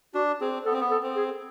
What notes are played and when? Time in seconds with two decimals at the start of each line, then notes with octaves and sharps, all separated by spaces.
0.14 D4 F#4
0.41 C4 G#4
0.65 B3 A4
0.73 C4
0.81 B3
0.91 A4
1.03 C4
1.16 G#4